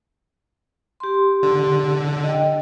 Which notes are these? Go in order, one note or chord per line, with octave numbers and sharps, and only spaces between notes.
G4 C6
D3
D#5 G5